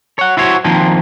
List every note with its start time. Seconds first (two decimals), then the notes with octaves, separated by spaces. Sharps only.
0.19 C#5 F#5
0.37 E4 F#4 C5 C#5
0.64 D#3 F3 A#3 C4